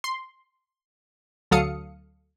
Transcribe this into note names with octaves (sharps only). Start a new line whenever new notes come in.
C6
D2 F#3 A4 F5 D#6 C#7